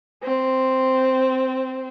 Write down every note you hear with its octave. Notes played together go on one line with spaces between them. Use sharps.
C4